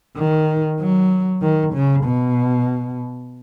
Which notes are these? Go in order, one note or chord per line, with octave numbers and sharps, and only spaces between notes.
D#3
F#3
D#3
C#3
B2